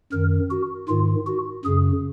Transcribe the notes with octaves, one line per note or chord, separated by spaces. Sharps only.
F#2 D#3 A#4
F#4
G#2 D#3 F4
F#4
F#2 C#3 G#4